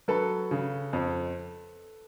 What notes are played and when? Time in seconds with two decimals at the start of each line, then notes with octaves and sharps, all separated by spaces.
0.08 F#3 A4 B4
0.51 C#3
0.93 F2